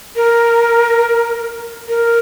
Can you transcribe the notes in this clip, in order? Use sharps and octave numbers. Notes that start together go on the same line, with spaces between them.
A#4
A#4